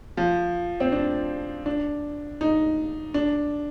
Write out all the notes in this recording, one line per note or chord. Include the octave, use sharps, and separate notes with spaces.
F3
C4
D4
D4
D#4
D4